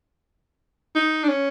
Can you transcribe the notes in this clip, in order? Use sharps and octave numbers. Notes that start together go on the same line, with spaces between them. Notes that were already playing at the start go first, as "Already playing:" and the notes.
D#4
D4
C#4